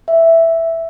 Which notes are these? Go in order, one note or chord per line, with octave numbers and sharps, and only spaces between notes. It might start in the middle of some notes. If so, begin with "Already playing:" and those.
E5